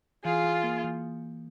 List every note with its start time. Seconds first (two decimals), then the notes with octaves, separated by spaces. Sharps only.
0.24 E3 F4 G#4
0.44 E3
0.64 A#3
0.84 E3